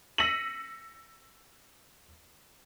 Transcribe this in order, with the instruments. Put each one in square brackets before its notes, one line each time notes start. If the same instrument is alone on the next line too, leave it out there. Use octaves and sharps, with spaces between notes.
[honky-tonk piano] E6 A#6 B6 C#7 D#7 F#7